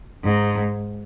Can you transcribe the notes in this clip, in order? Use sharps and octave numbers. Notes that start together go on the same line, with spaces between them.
G#2